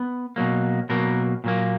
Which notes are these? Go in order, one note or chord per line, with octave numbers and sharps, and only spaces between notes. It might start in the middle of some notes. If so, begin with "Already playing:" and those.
Already playing: B3
B2 F#3 A#3
B2 F#3 A#3 A#4
A#2 F#3 A#3